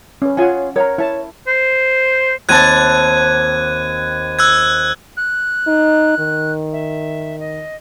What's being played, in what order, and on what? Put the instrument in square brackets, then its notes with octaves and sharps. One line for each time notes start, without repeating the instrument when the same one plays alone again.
[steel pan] C#4 B4
[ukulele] C#4 F4 G#4 [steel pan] F#5 G#5
[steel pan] A#4 [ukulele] C#5 F#5 A#5
[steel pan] E4 A5 [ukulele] C#5
[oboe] C5
[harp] D#2 C4 A5 [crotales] F#6 G#6 D#7
[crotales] E6 F#6 G#6
[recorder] F#6
[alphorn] D#4
D#3
[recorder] E5
D#5